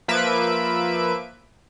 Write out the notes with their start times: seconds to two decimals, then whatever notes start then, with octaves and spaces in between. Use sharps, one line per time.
0.08 F3 A#3 B4 E5 D7